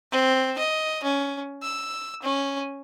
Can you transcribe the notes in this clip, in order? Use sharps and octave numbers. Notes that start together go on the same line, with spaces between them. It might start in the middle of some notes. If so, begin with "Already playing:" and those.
C4
D#5
C#4
E6
C#4